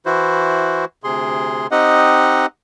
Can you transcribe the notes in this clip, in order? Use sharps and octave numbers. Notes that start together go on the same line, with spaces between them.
E3 E4 F#4 C5
D2 C3 G#4 C6
C4 D#4 G4 D#5 F#5